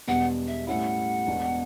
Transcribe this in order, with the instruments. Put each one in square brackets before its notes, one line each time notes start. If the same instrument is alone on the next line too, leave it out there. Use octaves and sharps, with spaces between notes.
[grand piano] E1 E2 B2 G3 B3 [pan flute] F#5
[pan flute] E5
[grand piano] A2 G3 C#4 E4 [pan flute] F#5
[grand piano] E1 E2 B2